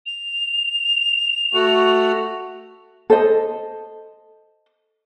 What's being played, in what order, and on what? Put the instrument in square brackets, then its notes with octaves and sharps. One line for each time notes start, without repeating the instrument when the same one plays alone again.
[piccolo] F7
[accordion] A3 F#4
[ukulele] A4 C5 D#5